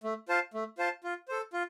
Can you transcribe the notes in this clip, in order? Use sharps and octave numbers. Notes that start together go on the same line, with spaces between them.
A3
F4 C5 F5 A5
A3
F4 C5 F5 A5
F4
A4 C5
F4